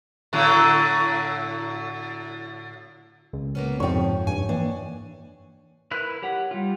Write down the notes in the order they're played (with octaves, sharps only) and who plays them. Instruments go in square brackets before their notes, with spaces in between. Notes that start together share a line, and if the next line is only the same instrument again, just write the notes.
[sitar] A2 D3 F#3
[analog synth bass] C#2
[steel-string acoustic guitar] A#3 B3 C#4
[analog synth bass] F2 [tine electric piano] G#2 [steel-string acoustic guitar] C3 F3 [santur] C#5 G5
[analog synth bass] G2 [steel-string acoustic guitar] G#5
[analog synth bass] E3 [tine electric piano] A#3 [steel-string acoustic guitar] D4
[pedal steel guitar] E4 A#4 B4 F#6
G4 C#5 F#5
G3 F4